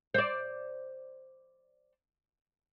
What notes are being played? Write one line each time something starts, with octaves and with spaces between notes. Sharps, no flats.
C5 D5